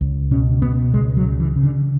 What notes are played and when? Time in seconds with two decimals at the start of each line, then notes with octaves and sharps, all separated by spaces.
0.01 C#2
0.31 B2 C#4
0.62 B2 B3
0.94 C#2 G#3
1.17 F#3
1.24 C#3
1.40 E3
1.56 C#3
1.63 D3